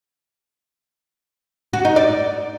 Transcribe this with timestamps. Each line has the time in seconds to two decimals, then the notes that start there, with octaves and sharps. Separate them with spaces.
1.73 F#4
1.85 D#4
1.96 D5